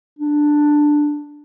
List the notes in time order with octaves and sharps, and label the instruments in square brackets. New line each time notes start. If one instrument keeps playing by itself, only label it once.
[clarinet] D4